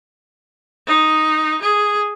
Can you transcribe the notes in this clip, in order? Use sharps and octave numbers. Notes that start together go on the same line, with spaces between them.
D#4
G#4